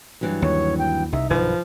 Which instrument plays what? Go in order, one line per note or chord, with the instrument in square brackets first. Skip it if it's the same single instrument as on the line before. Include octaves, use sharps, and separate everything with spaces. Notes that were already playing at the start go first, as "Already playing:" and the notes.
[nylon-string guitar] G2 E3 F#3
[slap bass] D#2 [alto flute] C#5
[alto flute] G5
[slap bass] C2 [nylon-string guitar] D#4 [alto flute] E5
[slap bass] B1 G2 D#3 [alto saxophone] F3 [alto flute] B4